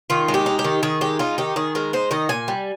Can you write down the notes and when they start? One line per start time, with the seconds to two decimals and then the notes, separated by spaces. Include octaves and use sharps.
0.10 D#3 F4
0.28 G#3
0.34 G4
0.46 D#4
0.59 G4
0.64 D#3
0.83 D#3 G#4
1.01 G#3 G4
1.19 D#4 F4
1.38 D#3 G4
1.56 D#3 G#4
1.75 G#3 A#4
1.93 D#4 C5
2.11 D#3 D#5
2.29 A#2 G#5
2.48 G3